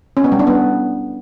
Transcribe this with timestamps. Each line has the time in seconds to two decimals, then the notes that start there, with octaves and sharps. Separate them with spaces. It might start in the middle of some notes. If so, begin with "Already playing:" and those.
0.17 C#4
0.24 B3
0.32 G3
0.39 D4
0.47 B3